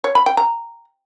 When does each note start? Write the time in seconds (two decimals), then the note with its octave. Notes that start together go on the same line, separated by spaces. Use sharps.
0.04 C#5
0.15 B5
0.26 G5
0.37 A#5